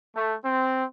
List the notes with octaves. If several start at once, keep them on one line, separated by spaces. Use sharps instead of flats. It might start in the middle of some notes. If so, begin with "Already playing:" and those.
A3
C4